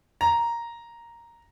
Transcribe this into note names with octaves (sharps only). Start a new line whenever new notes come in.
A#5